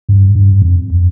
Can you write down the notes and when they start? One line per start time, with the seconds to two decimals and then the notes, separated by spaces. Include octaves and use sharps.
0.09 G2
0.35 G2
0.62 F2